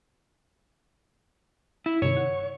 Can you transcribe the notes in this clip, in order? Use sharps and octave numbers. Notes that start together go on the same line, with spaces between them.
E4
G2 C3 D#3 C#5
F#5